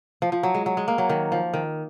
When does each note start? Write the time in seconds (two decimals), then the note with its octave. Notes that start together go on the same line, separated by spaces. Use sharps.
0.22 F3
0.32 F3
0.43 F#3
0.55 G#3
0.66 F#3
0.77 G#3
0.88 A#3
0.98 F#3
1.09 D#3
1.32 F3
1.54 D#3